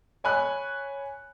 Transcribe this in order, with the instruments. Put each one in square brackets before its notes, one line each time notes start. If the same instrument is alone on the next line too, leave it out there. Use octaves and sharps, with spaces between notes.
[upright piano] C#5 G#5 B5 F#6